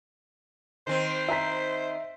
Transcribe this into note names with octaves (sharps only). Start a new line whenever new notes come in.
D#3 C4 C5
E5 A#5 B6